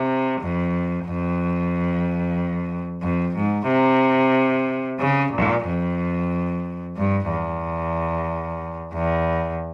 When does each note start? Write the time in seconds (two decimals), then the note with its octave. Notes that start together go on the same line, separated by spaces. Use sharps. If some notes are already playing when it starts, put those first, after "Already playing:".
Already playing: C3
0.41 F2
1.06 F2
3.02 F2
3.36 G#2
3.68 C3
4.99 C#3
5.32 A#2
5.66 F2
6.96 G2
7.29 E2
8.93 E2